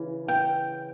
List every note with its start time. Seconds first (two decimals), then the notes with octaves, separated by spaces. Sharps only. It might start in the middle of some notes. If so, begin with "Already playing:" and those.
Already playing: C#3 E3
0.28 G5